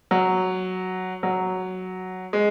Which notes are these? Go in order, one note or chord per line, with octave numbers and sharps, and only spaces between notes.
F#3
F#3
G#3